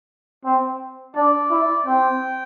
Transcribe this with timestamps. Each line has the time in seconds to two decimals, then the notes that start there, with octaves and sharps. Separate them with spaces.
0.45 C4
1.16 D4 D5
1.51 E4
1.86 C4 G5